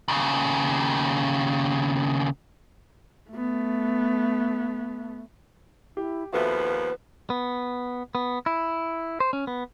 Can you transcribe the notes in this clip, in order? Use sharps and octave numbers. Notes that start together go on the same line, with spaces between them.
D#2 C#3
A3 B3
E4 G4
D#2 F3 B3 F#4 A4 B4 E5
B3
B3
E4
C5
C#4
B3